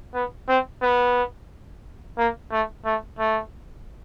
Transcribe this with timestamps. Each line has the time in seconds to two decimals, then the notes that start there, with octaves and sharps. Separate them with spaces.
0.14 B3
0.48 C4
0.82 B3
2.18 A#3
2.52 A3
2.85 A3
3.19 A3